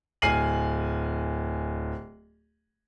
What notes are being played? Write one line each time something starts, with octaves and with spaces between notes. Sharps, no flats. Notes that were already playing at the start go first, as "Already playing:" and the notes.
D1 G#5 F6 C7 D#7 F#7